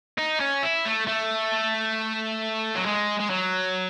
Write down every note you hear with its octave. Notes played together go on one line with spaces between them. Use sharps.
D#4
C#4
E4
A3
A3
F#3
G#3
G#3
F#3